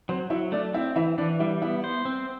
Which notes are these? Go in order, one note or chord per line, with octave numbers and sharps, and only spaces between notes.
F#3 C4 C5
F#3 E4 E5
A3 D4 D5
C4 E4 E5
E3 E4 E5
E3 D4 D5
G3 E4 E5
B3 E4 E5
C5
C4